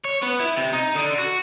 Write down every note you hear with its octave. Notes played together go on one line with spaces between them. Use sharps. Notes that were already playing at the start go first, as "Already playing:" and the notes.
C#5
B3
E4
C3
D#4
D3
F#4